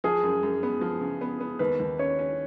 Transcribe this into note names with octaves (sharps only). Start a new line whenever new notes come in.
F3 G#4
F#2
F#2
B3
F3
C#3
B3
B3
D#2 B4
D#2
C#4 C#5
C#4